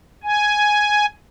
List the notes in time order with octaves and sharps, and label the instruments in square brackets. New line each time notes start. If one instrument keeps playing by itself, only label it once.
[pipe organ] G#5